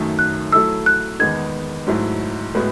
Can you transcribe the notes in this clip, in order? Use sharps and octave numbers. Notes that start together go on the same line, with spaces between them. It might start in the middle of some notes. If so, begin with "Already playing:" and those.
Already playing: F#2 D#3 F#3 A3
F#6
F#3 A3 E4 A4 E6
F#6
E2 D#3 G#3 B3 D#4 G#6
G#2 F#3 A3 E4
A2 G#3 B3 F#4